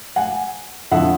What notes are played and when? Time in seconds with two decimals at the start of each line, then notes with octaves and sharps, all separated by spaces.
0.16 F#5 G#5
0.91 F2 D3 F3 E5 F#5